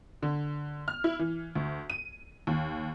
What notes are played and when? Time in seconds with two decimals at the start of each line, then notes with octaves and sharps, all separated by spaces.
0.23 D3
0.88 F6
1.04 E4
1.19 E3
1.55 D2
1.90 D#7
2.47 D#2